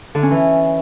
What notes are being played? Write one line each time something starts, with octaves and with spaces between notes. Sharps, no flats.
D3
C#4
E3